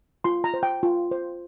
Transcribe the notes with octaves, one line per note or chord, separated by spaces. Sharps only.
F4 C6
A#5
C5
G5
F4
C5